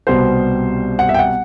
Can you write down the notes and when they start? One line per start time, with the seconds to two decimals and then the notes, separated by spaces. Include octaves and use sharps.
0.07 C2 B2 G3 B3 C5
0.99 F#5
1.09 E5
1.14 G5
1.19 F#5